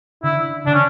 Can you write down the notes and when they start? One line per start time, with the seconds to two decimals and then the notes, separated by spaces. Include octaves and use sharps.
0.23 D3 E4
0.66 D3 D4
0.74 C#4